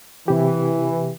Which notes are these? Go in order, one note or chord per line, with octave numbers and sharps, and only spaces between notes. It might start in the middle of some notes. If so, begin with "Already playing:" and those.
C3 E3 G4